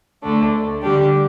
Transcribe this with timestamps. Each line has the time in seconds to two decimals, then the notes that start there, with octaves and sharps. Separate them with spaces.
0.23 D2 D3 A3 D4
0.82 D3 G3 D4 G4